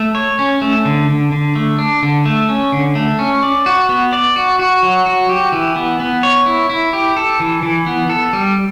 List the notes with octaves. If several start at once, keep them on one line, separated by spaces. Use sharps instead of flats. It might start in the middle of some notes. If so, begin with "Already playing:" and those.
Already playing: A3
C#5
C#4
A3
D3
D3
D3
A3
D4
D3
A3
C#4
D3
A3
C#4
D5
F#4
B3
D5
F#4
F#4
F#3
F#4
G4
E3
B3
B3
C#5
E4
E4
G4
A4
E3
E3
B3
A4
G3